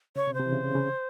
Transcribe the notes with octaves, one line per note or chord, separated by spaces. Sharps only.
C#3 C#5
C3
C5
C3
E3
C#3
C#3
C#3